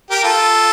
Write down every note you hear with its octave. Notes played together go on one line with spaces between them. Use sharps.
G4 A#4
F4 A4